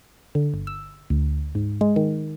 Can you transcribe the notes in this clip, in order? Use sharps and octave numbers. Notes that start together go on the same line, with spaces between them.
D3
G1
E6
D2
G#2
G#3
D#3